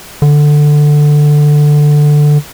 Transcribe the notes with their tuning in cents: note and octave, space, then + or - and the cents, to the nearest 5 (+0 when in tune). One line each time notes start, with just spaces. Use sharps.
D3 +10